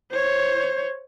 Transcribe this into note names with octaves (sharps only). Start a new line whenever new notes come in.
C5 C#5